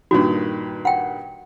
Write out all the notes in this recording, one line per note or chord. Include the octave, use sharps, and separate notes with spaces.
G2 A#2 D#3 F#4
F#5 G5